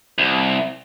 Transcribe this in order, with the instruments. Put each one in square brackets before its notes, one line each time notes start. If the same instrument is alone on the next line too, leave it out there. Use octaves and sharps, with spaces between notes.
[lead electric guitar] C2